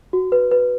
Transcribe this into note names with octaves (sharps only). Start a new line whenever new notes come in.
F#4
B4
B4